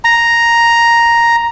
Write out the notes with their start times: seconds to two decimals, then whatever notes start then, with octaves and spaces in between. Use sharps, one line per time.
0.04 A#5